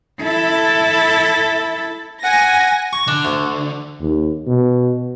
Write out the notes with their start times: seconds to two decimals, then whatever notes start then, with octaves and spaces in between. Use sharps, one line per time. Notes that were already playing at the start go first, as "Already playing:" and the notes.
0.21 E4 A4
2.24 F#5 G#5 A#6
2.93 C#6
3.08 D3 D4
3.25 D2
4.01 D#2
4.47 B2